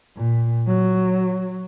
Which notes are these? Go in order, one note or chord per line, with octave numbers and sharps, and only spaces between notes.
A#2
F#3